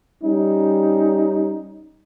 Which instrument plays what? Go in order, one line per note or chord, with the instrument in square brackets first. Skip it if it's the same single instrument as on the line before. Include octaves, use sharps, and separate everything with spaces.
[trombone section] G3 C#4 D#4